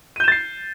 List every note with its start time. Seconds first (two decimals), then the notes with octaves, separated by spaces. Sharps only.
0.16 D#7
0.20 G6
0.24 E7
0.28 A6
0.32 C7